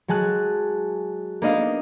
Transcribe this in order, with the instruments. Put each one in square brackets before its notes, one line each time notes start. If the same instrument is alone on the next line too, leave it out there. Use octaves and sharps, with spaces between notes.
[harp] F#3 G#3 G#5 A5 F#6
A#3 B3 D4 D#4 D#5 F5